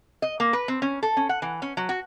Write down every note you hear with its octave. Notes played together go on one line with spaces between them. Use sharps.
D#5
A#3
B4
C4
C#4
A4
C#4
F#5
E3
C#4
F#3
F#4